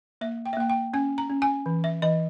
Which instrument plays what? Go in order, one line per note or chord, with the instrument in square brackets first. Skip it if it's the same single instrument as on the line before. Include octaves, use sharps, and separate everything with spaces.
[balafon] A#3 E5
G5
E5
A#3 G5
G5
C#4 G#5
A#5
C#4
G#5
E3
E5
E3 D#5